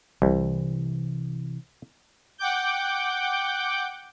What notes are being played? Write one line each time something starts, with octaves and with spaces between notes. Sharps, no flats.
C2 C3 E3
F#5 G5 D6 G6